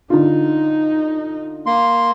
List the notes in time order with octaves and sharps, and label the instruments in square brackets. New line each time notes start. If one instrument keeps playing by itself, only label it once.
[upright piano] D3 F4 [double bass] D#4
[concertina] A#3 C6